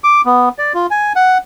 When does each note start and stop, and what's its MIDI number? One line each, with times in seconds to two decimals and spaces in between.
0.04 0.21 86
0.26 0.49 59
0.58 0.73 74
0.74 0.87 65
0.91 1.13 80
1.16 1.38 78